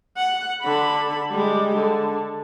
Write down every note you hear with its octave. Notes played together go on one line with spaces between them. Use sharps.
F#5
D3 B5
G3 G#3
D3